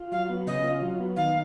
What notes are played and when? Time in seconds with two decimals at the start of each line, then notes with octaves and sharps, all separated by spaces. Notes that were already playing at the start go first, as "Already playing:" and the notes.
Already playing: F4
0.12 F#3 F5
0.30 B3
0.47 C#3 D#5
0.64 F4
0.81 F#3
1.00 B3
1.16 D#3 F5